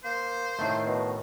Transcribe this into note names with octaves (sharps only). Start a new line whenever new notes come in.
A#3 C5
A2 D#3 A3
B2